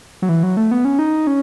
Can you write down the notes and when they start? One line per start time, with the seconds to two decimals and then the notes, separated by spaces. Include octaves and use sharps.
0.22 F#3
0.29 E3
0.43 F#3
0.57 A3
0.71 B3
0.85 C#4
0.99 D#4
1.27 C#4